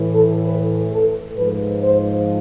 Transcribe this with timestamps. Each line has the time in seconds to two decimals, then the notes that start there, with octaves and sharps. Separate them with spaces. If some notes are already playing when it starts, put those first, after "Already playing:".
Already playing: A2 E3
0.13 A4
0.45 B4
0.91 A4
1.37 G#2 F3 B4
1.83 C5